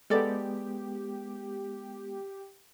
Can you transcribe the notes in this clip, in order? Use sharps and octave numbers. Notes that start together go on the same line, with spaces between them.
G#3 B3 G4 A4 D5